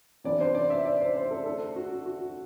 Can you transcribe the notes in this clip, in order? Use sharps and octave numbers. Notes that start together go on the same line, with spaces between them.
C3 E3 B3 D4 D5
C5
D5
E5
D5
C5
C5
A4
D3 A3 D4 A4
F#4
F#4